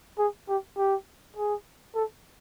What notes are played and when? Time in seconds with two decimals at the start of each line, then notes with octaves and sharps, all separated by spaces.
0.19 G#4
0.48 G4
0.77 G4
1.37 G#4
1.95 A4